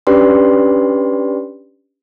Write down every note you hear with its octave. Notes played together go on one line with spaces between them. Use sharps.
C#4 D4 G4 B4 D5 C6